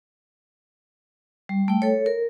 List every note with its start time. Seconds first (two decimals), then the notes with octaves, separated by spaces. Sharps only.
1.49 G3
1.68 A3 G5
1.82 A4 C#5
2.06 A#4